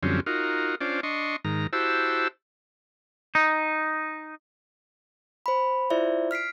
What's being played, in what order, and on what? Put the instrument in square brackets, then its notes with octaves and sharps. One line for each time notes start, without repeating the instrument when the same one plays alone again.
[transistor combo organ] F#2 D3 F3 G3 C4 C#4
D#4 F4 F#4 A#4
C#4 D4 F4 C5 D5
D4 D#5 C6 C#6
G#2 D#3 A#5
E4 F#4 G4 C5 A5 E6
[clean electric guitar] D#4
[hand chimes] C5 B5
E4 F4 C5 D5 E5
F6 B6 C7 D7